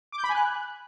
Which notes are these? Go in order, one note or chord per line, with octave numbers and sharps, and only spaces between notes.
D6
G6
B5
G#5
F#6